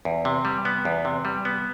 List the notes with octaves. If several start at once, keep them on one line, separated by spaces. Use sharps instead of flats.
E2
C3
G3
B3
E2
C3
G3
B3